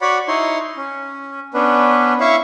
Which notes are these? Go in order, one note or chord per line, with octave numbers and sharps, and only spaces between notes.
F#4 C#5 D5 F#5 B5
D#4 E4 C#5 C6
C#4
B3 C#4 D4 B4
E4 C#5 E5 F5 C#6